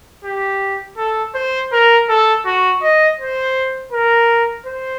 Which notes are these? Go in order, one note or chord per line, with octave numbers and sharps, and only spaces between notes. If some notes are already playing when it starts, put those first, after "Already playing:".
G4
A4
C5
A#4
A4
F#4
D#5
C5
A#4
C5